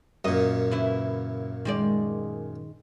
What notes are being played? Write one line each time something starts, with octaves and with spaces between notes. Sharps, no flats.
F#2 A#2 D#5
C#3 E4 B4
D#3 G#3 D5